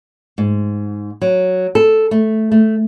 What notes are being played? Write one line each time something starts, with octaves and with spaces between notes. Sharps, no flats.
G#2
F#3
A4
A3
A3